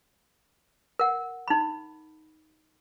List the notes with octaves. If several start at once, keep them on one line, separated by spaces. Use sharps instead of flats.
A#4 F#5
D#4 B5